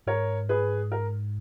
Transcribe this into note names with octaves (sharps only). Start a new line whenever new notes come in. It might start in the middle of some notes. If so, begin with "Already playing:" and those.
G#2 A#4 C#5
G#4 B4
A#4